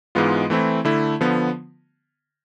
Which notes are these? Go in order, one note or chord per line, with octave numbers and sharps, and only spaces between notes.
G#2 E3 G#3 B3 F4
E3 A3 C4 E4
D3 A3 E4
D3 F3 B3